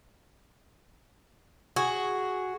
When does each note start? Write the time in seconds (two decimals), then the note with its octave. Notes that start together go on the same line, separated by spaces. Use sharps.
1.76 F#4 G#4